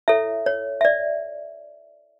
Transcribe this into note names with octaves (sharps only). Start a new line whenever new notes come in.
E4 A4 C#5 E5
C#5
E5
D5